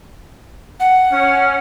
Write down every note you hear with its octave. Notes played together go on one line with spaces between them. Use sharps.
F#5
C#4